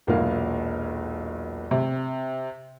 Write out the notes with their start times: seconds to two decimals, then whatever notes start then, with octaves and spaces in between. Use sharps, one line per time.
0.07 E1 B1 A#2 E4 A#4 F5
1.71 C3